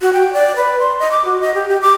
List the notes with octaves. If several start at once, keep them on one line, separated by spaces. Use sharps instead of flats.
F#4
G5
D5
B4
C6
D#5
D6
F#4
D#5
G4
G4
D6